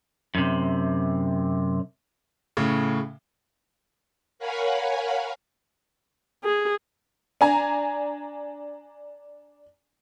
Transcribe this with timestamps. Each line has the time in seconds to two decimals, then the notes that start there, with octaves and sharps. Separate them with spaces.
0.35 F#2 C3
2.57 A2 C#3
4.39 A#4 C#5 F5 F#5 G#5 B5
6.44 G#4
7.41 D4 G#5 A#5